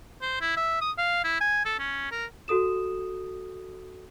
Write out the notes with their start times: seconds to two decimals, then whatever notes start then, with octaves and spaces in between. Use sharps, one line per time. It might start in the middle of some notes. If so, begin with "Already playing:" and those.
0.22 C5
0.41 E4
0.56 E5
0.81 D#6
0.98 F5
1.24 E4
1.41 G#5
1.65 A4
1.79 C#4
2.11 A#4
2.48 F#4 A4 D#6 E7